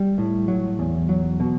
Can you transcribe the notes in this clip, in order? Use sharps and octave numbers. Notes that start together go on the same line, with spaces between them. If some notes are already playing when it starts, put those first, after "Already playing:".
Already playing: G3
A2
F#3
E2
F#3
B2